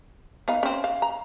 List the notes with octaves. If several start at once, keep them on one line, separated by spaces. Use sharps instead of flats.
B3 D#4 F5
C4 C#4
F5
A#5